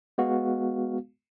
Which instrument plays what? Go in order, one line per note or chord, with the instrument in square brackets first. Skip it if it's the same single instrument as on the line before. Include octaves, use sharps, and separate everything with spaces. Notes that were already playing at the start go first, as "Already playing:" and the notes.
[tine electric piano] G#3 B3 F#4 F5